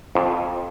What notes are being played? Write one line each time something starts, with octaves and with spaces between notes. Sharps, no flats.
F2